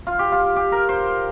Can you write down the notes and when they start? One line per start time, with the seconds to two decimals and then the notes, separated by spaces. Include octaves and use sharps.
0.07 F4
0.19 G4
0.32 F4
0.56 G4
0.72 A#4
0.89 C5